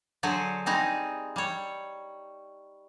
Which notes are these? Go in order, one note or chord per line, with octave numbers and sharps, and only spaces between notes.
D3 F#3 G#4 C5
G3 C4 D#4 G#4
G3 C#5